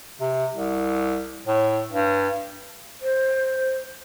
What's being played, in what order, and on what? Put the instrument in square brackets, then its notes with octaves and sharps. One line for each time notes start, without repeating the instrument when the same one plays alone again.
[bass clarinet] C3
C2
A2
G2
[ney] C5